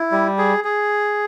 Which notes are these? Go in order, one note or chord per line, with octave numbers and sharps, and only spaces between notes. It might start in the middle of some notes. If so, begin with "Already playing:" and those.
Already playing: E4
G3
G#4
G#4